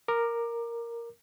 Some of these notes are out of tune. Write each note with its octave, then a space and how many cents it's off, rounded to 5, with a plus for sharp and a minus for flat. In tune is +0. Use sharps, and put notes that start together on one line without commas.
A#4 +0 D6 +20